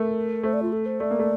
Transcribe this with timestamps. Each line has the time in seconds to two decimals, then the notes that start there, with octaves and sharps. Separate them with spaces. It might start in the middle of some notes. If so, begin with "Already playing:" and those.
Already playing: A3 A#4
0.43 A3 C5
0.53 D5
0.63 F4
0.73 A4
0.86 C5
1.00 A3 D5
1.11 A#3
1.19 A3